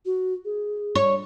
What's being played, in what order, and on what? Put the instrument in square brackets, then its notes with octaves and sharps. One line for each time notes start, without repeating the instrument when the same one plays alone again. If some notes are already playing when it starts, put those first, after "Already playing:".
[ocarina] F#4
G#4
[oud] C#5